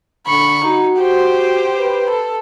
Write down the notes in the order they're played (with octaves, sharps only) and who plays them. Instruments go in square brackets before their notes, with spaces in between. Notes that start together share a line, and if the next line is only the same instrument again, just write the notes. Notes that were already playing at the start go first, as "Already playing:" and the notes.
[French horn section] D3 [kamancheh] B5 C#6
[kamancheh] D#4 [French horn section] F#4
[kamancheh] G4 C5
[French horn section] B4
[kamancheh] A4